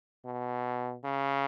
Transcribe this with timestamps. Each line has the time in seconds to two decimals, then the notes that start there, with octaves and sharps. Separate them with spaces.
0.25 B2
1.04 C#3